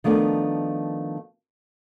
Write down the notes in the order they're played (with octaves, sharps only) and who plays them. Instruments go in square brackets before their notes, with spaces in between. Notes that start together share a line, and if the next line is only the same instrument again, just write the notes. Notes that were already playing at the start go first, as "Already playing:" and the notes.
[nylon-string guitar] D#3 F3 A3 B3 D4